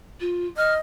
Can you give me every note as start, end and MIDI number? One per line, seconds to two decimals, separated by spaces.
0.20 0.46 65
0.57 0.78 75
0.57 0.74 89